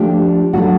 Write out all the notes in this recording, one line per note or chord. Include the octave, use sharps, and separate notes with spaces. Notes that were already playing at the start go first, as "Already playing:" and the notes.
Already playing: F3 A3 D4 G4
F#3 A3 D4 F#4